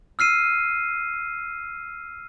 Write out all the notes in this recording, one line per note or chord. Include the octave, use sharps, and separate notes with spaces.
E6 F6 C7 D#7